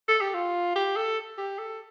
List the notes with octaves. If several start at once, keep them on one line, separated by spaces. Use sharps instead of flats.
A4
G4
F4
G4
A4
G4
A4